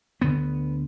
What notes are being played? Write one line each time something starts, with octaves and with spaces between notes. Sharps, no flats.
D2 D3 B3